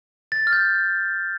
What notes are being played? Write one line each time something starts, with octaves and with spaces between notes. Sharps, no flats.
A6
F6
G6